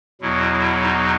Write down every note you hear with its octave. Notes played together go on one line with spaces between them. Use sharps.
E2 B2 F#3 E4
E4
D#4